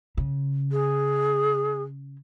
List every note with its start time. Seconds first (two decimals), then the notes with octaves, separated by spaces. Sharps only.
0.17 C#3
0.72 G#4